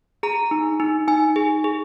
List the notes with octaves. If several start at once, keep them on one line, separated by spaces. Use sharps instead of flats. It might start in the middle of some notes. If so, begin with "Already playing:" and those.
G#4 A#5
D#4
D#4
D#4 G#5
G#4
G#4